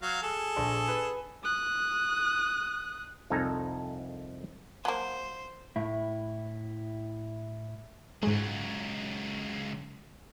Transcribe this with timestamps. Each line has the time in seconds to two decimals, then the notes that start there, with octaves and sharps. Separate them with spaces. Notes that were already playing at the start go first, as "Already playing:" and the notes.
0.02 F#3 F5
0.22 G#4 A4
0.56 A#1
0.88 B4
1.44 D#6 F#6
3.30 C2 F2 D#4 A4 G#5 A#5
4.85 F#3 A#3 C5
5.76 A2 E4
8.23 C#2 G#2 F#3 G#3